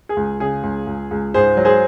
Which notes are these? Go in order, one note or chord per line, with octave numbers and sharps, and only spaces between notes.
G#4
C#2
C#3 G#4
C#2
C#2
C#2
G#2 G#4 C5
F#3
G#4 C5